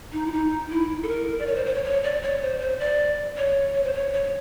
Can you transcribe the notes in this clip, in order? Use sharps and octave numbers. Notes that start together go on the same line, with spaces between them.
D#4
E4
D#4
E4
A4
A#4
D5
C#5
C5
C5
C#5
C#5
D5
C#5
C5
C5
D5
C#5
C#5
C5
C#5
C#5